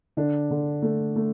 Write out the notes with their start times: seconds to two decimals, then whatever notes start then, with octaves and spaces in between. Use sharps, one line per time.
0.17 D3 D4
0.51 D3
0.82 A3
1.16 A3